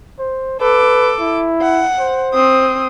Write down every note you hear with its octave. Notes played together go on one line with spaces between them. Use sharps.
C5
A4 B4 D6
E4
F#5
C5
C4 D#6